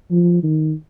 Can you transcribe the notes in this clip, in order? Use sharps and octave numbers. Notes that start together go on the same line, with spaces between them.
F3
D#3